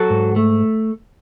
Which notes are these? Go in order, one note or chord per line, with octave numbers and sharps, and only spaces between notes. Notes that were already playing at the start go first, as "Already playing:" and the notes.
Already playing: F#3 F#4 A4
G#2
A3